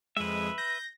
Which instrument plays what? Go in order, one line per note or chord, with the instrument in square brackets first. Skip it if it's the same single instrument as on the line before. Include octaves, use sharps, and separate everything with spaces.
[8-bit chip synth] F2 G#3 [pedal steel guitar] B4 E5
[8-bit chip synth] G6 [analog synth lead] A#6